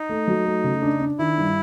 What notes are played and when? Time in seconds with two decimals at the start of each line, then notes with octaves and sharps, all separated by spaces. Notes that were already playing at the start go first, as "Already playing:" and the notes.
Already playing: D#4
0.09 A3
0.27 F#3
0.45 A3
0.64 C#3
0.82 D4
1.00 D4
1.19 D#3 E4
1.38 G2